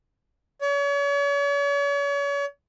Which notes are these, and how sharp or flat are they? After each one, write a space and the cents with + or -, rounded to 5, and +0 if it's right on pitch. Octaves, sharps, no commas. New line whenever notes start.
C#5 +40